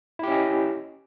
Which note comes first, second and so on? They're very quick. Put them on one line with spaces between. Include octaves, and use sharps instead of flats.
E4 G4 C#4 D#5